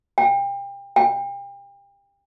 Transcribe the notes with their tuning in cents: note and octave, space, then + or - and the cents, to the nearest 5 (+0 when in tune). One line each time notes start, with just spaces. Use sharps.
G5 +30
G5 +35